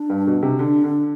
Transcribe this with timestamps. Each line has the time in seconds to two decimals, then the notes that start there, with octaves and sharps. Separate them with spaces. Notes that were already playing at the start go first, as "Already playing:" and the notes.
Already playing: D4
0.10 G2
0.27 B2
0.42 C3
0.59 D3 D4
0.84 D3